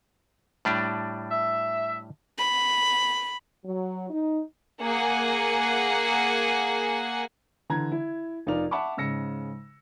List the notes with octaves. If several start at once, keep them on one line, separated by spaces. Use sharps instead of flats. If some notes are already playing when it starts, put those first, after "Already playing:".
A2 G3 D4
E5
B5
F#3
D#4
A#3 G#4 F#5 G#5
D3 E3 A#5 G#6
E4
F1 D#4 F4 A#4 D5 F7
E5 F#5 A5 B5 C#6 D6
G#2 C#3 E6 A#6 C#7